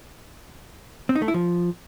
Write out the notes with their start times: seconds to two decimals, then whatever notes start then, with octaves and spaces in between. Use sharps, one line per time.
1.09 C4
1.15 D#4
1.22 A3
1.28 E4
1.34 F3